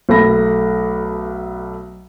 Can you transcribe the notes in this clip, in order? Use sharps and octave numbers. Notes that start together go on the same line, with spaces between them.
B1 A3 B5 A#6